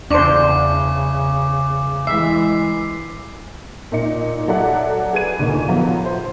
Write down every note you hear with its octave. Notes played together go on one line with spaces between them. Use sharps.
E2 C#3 D4 C5 D6
E3 G#3 E5 C7
A#2 D#4 C#7
F#3 A4 D5 E5 F#5
G#4 B4 G#6 D#7
D2 A#2 D#4
F3 F#3 B3 F4
C5